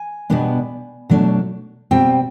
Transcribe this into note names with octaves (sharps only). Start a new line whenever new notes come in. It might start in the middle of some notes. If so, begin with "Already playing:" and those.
Already playing: G#5
B2 G3 B3 D4
B2 F#3 A3 D4
B2 G3 C4 G5